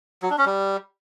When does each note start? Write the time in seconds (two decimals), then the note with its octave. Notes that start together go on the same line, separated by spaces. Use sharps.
0.22 F#3
0.30 D4
0.38 C#4
0.46 G3